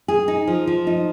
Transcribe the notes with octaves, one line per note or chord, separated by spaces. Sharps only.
G#4
D#4
F3
F3
D#4